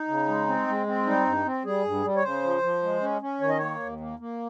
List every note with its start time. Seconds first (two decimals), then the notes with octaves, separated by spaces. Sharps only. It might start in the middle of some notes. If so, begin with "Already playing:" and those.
Already playing: D#4
0.08 C#3
0.28 G#3
0.47 C4
0.67 G#3
0.87 C4
1.06 G3 D#4
1.25 G2
1.45 C4
1.65 G3 G#4
1.85 G2
2.03 G3
2.16 C#5
2.23 C#3 C5
2.43 F3
2.62 F3
2.83 G#3
3.02 C#4
3.21 C#4
3.41 D#3 C#5
3.49 D#5
3.58 A#3 C#5
3.80 D#2
4.00 A#3
4.19 A#3